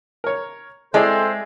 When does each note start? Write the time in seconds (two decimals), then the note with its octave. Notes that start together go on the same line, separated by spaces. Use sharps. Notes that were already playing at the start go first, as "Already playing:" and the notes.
0.24 A#4 C#5
0.94 G#3 C4 E4 G#4 A4 C5 D5